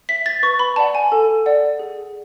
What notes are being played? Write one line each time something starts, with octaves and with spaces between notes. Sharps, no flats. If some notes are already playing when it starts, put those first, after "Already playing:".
E5 B6
A6
B4 C#6
B5
D5 F#5 A5
G#5
A4
D5 F#5
G#4